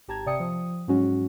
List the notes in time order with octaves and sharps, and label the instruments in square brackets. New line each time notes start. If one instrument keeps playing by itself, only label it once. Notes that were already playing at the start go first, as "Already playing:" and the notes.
[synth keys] G#1 G4 A5 A#5 G#6
C3 D5 E5 G5 D#6 C#7
F3 D#6
G#2 F#3 G#3 C#4 F#4